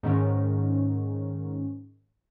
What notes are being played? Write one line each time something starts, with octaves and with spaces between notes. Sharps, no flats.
G#2 D#3 C#4